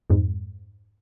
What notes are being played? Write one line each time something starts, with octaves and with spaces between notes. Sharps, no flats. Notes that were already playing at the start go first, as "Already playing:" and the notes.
F2 G#2